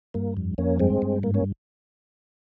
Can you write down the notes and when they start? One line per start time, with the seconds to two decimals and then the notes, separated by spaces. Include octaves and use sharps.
0.14 G2 A#3
0.37 F2
0.58 F2 A#3 C#4
0.80 G2 G#3 C4
1.02 G2
1.23 G#2 A#3
1.34 A#3 C#4